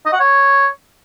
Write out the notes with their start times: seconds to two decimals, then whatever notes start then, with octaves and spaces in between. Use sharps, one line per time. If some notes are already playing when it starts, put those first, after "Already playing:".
0.06 D#5
0.13 F#5
0.20 C#5